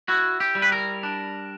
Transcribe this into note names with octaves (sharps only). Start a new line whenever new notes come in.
E4 F#4
G4
G3
B4
A#4
D4